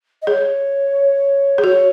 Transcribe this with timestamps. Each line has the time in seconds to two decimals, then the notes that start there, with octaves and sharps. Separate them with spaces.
0.22 D#5
0.27 G#4 C#5
1.58 G#4
1.63 F#4 C#5